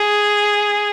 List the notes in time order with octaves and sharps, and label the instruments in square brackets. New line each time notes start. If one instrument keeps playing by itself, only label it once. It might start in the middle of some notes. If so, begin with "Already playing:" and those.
Already playing: [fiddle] G#4